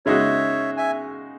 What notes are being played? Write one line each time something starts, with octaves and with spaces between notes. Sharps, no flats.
C#3 G#3 D#4 F#4 C#5 E5
E5 G#5